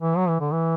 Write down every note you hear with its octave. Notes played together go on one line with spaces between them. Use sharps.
E3
F#3
E3
D3
E3